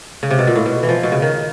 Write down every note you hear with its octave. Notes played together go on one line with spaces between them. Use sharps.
C#3
C3
B2
A#2
A2
B2
E3
F3
B2
C#3
D#3